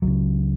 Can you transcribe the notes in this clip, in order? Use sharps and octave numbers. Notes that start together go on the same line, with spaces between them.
C#2 C#3 F#3